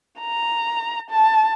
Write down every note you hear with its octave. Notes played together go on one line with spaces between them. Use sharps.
A#5
A5